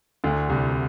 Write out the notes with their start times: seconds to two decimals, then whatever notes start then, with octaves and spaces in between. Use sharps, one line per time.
0.24 D2 D3
0.49 C2 C3